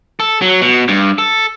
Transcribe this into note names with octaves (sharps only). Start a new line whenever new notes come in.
A4
F#3
B2
G2
A4